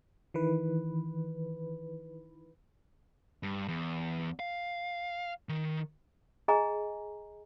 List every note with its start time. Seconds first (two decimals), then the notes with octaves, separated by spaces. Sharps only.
0.34 D#3 E3 B4
3.43 G2
3.68 E2
4.39 F5
5.49 D#3
6.48 G#4 D#5 G#5 A#5